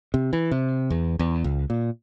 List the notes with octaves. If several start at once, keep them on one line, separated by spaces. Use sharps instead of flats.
C3
E3
C3
E2
E2
C#2
A#2